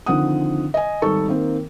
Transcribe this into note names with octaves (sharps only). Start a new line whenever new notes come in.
D3 D#3 F3 C4 F#5 D#6
D#5 G#5
G#1 G3 D#4 A4 C#6
D#3 A#3 C4